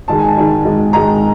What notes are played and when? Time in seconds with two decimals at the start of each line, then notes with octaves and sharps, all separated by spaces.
0.08 G#2 D#3 G#3 A5
0.19 G#5
0.28 A5
0.37 G#2 D#3 G#3
0.65 G#2 D#3 G#3
0.93 G#2 D#3 G#3 A#5